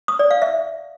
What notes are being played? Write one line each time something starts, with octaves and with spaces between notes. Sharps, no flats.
D#6
D5
F5
E5